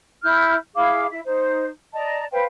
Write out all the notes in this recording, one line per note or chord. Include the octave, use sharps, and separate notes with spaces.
E4 F6 G6
E4 G#4 F5 D6
E4 E5
D#4 C5
D5 D#5 A5 A#5
B4 C5 F5 G5